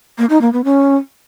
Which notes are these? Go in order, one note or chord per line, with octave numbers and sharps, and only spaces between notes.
A#3
D#4
A#3
B3
C#4